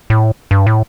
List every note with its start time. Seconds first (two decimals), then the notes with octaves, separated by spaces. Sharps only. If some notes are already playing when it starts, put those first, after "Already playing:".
0.10 A2
0.51 G2
0.67 A2